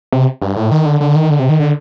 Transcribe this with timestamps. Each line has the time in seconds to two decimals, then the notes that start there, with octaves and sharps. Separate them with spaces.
0.12 C3
0.42 G2
0.56 A2
0.71 D#3
0.86 D3
1.01 D3
1.16 D#3
1.30 D3
1.39 C3
1.49 D#3
1.60 D3